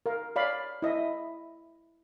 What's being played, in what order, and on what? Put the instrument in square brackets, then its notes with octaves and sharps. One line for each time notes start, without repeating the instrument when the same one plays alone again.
[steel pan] A#4 F5
C#5 D5 F5 B5
E4 D#5 E5